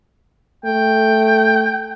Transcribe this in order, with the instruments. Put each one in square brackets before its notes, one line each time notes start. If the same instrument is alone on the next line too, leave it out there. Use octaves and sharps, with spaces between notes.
[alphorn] A3 [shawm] G5